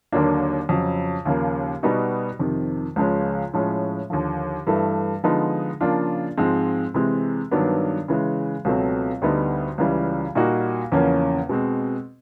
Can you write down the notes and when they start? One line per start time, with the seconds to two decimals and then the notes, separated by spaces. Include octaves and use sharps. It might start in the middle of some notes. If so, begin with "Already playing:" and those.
0.12 D#2 D3 F#3 A#3 D4
0.69 F2 C#3 F#3
1.25 D#2 C#3 F3 A#3
1.83 B2 G3 B3 D#4 F#4
2.39 F2 C3 D#3
2.96 C#2 C#3 F3 G#3 C#4
3.54 A2 F3 G#3 C#4
4.10 D#2 D3 F3
4.67 G2 E3 A3
5.24 D3 F3 G#3 B3 D#4
5.81 C#3 F3 A#3 D4 F4
6.37 G#2 F3 G#3 C4
6.94 C3 E3 G#3 C4
7.51 G2 D#3 F#3 B3 D4
8.08 C#3 E3 G#3
8.65 C#2 B2 F#3 A3 C4
9.22 D2 D3 G3 B3 D#4
9.78 C#2 C#3 E3 G3
10.35 A#2 G3 A#3 D#4 F#4
10.92 E2 C#3 F3 A#3 C#4
11.49 B2 G#3 C4